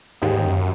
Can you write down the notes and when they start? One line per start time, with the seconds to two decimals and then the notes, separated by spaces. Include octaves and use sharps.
0.22 D#2 G#2
0.37 D#2
0.45 F#2